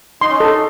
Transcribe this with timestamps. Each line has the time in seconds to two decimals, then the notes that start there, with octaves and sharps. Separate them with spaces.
0.21 D#4 C6
0.30 C#4
0.37 D#4 A4